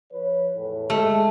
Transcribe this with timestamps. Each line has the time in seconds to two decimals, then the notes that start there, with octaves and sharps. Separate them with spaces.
0.13 F3 B4 C#5
0.55 E2 A2
0.90 G#3 A3